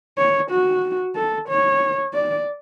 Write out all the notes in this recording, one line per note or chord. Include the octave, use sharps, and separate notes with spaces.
C#5
F#4
A4
C#5
D5